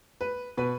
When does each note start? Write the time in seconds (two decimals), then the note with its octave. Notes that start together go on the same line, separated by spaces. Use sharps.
0.21 B4
0.57 B2 B4